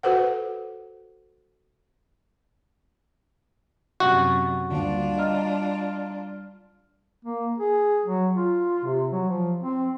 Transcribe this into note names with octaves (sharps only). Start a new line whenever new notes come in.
F#4 A4 B4 C5 F#5
F#2 C3 F#4
D2 G3 A#3 D4 F4
D#5 A#5 F6
A#3
G#4
F#3
F4
C3
F#3
F3
C4